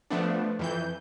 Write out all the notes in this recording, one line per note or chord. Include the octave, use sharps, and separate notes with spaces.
F3 A3 B3 D4
F2 E3 G6